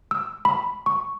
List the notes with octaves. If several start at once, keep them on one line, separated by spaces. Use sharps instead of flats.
E6
B5
C#6